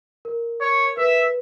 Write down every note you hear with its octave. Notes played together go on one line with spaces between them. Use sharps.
A#4
C#5
B4 E5